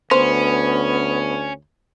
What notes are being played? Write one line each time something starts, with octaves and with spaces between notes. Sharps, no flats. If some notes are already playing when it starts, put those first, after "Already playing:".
D2 B3 C#4 C5